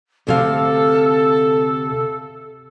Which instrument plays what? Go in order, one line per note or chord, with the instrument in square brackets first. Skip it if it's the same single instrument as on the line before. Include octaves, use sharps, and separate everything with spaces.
[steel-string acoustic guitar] D2 C3 F5 [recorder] A4